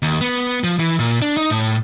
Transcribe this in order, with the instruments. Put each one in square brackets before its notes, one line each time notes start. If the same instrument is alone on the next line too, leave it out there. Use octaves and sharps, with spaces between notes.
[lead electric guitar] D#2
B3
F3
E3
A#2
D4
D#4
A2